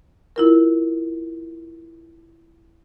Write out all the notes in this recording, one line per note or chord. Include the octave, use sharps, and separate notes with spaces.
E4 F4 A#4